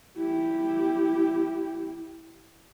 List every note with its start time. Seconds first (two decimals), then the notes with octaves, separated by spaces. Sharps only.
0.17 E4 G4